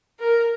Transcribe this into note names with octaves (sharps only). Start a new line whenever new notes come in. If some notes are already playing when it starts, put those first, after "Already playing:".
A#4